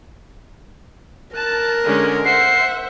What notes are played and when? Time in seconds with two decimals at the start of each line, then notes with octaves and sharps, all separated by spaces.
1.36 A#4 A5 F#6
1.84 D3 G#3 C#4
2.25 C5 E5 F#5 C7